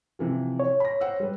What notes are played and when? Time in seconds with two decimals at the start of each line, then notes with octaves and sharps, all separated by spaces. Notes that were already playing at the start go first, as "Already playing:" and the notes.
0.19 C3 E3 F3
0.60 C#5
0.80 B5 A#6
1.00 C5 F#5 E6
1.20 G3 B4